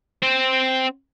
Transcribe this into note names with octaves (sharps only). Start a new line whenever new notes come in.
C4 C5